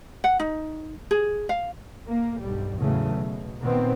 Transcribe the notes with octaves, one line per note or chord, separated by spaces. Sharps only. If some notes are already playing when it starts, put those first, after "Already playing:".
F#5
D#4
G#4
F5
A#3
B1 G2 G3
E2 A2 C#3 F#3 A3
B2
A#2 D#3 B3 C4